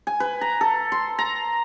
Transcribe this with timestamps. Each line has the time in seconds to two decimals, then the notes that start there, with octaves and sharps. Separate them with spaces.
0.07 G#5
0.20 B4
0.41 A#5
0.61 A4
0.92 C6
1.19 A#5